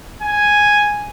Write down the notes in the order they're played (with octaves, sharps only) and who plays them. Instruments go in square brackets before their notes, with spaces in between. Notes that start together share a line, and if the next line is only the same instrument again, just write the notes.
[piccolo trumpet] G#5